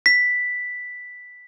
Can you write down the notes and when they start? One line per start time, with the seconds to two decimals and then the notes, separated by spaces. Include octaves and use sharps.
0.06 B6